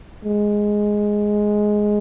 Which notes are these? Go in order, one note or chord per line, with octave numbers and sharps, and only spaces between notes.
G#3